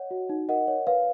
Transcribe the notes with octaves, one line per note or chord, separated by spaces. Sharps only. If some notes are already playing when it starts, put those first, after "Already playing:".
Already playing: C#5 D#5 F#5
F#4
D#4
A#4 D#5 F#5
C#5
B4 F5